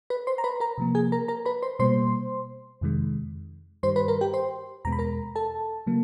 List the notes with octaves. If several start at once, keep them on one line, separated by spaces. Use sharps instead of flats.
B4 B5
C5 C6
A#5
B4 B5
A#4 A#5
C3 F3 A#3
G#4 G#5
A#4 A#5
A#4 A#5
B4 B5
C5 C6
B2 G3 A#3 C5 C6
F2 C3 D#3 G#3
G2 D#3 G3 C5 C6
B4 B5
A#4 A#5
G4 G5
C5 C6
E2 B2 G#3 B3 A#5
B5
A#4 A#5
A4 A5
C#3 F#3 A#3